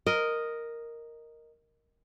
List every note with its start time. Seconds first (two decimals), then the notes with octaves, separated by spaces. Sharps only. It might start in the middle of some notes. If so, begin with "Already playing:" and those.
0.07 A#4 D#5